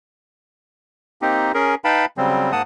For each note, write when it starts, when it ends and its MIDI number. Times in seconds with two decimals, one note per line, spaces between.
1.22 1.52 58
1.22 1.52 60
1.22 1.52 63
1.22 1.52 67
1.54 1.75 61
1.54 1.75 68
1.54 1.75 70
1.84 2.05 63
1.84 2.05 71
1.84 2.05 77
1.84 2.05 79
1.84 2.05 81
1.84 2.05 83
2.17 2.52 49
2.17 2.52 54
2.17 2.52 55
2.17 2.52 60
2.52 2.62 44
2.52 2.62 58
2.52 2.62 78
2.52 2.62 81
2.52 2.62 87